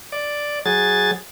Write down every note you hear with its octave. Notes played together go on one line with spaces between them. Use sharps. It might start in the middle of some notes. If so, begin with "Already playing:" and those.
D5
F#3 G#4 A6